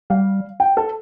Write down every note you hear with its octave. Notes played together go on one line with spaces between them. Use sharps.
G3 F5
G5
A4